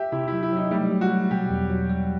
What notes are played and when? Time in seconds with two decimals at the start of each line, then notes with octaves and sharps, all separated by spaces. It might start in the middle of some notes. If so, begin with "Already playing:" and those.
Already playing: G4 E5
0.12 C3 E4
0.28 F#3 E4
0.43 E4
0.52 F#3 D#4
0.71 G3 A3
0.92 F#3
1.01 F#4
1.11 F#3
1.31 B2 G4
1.50 E2
1.70 F#3
1.90 G3